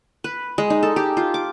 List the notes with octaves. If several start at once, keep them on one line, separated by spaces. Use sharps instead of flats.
B4
G#3
D#4
A4
G4
F4
D6